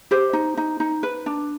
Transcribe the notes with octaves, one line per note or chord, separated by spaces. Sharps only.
G4 C5
D#4
D#4
D#4
B4
D4